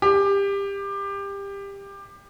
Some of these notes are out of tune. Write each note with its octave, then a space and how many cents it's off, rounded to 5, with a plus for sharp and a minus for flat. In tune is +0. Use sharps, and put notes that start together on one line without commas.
G4 +20